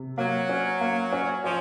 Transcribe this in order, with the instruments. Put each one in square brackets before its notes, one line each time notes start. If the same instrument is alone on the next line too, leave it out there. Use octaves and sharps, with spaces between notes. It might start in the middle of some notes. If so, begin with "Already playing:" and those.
Already playing: [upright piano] C3
[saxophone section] F#3 [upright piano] A#3
[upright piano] C#4
A#3
C#4
[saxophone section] F3 [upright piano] C#4